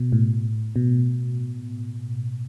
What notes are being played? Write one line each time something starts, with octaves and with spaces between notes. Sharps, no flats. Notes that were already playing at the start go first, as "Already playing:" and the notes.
Already playing: B2
A2
B2